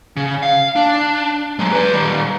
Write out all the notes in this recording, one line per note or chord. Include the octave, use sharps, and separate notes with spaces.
C#3
F5
D4
F#3 G#3
B4 D5
D#3 G3